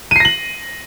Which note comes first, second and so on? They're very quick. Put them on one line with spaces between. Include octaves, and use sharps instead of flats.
D#7 C7 A#6 F#7